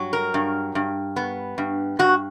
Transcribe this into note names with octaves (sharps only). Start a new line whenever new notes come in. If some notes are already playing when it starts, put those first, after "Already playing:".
Already playing: G2 F#3
A#4
G2
G2
B3
G2
G2 F#4